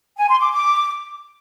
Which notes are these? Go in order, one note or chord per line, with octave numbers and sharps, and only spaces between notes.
G#5
C6
D6
D6